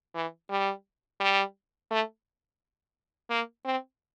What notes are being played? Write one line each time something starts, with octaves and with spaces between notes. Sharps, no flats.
E3
G3
G3
A3
A#3
C4